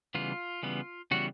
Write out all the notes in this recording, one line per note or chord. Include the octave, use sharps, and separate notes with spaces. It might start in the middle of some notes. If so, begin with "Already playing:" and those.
C#3 E3 G3 B3 F4
C#3 E3 G3 B3
C#3 E3 G3 B3 F#4